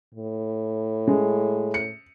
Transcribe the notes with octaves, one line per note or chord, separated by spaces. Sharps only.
A2
G#3
C#7